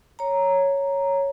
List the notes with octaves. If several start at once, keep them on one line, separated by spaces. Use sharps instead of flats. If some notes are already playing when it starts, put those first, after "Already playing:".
C#5 A#5